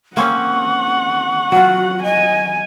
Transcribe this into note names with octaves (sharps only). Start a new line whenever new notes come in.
A#3 C4 C#4 F#5 C#6
F#3 F4 F#4
D#5 G#5